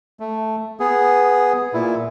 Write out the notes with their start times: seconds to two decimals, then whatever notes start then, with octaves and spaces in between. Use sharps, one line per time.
0.20 A3
0.80 B3 G#4
1.74 A#2 E4